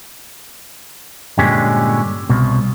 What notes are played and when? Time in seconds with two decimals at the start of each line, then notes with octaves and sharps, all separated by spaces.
1.39 G2 A#2 D3 G#3 C#4 G4
2.29 C2 B2